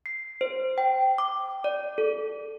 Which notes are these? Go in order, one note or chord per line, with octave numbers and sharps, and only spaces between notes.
C7
C5
G5
D6
D5
A4